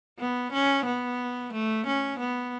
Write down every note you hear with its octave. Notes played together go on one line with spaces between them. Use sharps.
B3
C#4
B3
A3
C#4
B3